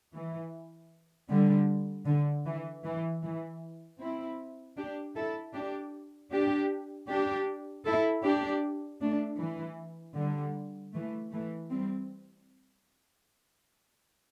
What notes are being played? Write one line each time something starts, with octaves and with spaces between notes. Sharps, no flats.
E3
D3 G3
D3
E3
E3
E3
C4 E4
D4 G4
E4 A4
D4 G4
D4 G4
D4 G4
E4 A4
D4 G4
A3 D4
E3
D3 G3
E3 A3
E3 A3
G3 C4